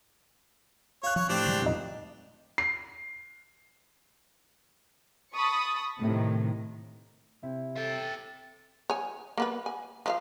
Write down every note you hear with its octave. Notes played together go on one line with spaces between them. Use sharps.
C#5 F5 F#6
F3 C#5
A2 C4 D4 G4
D3 F#3 G#3
F2 A#2 D#4 D#5
C7
A5 B5 C#6 D#6
A2 C3 D#3
C3 E4
A4 E5 G5
C#5 G#5
A#3 B3 B4
G#5
F3 E5 F5